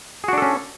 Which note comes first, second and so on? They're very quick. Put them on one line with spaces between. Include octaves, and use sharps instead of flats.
G#4 F#4 D4 A4 C#4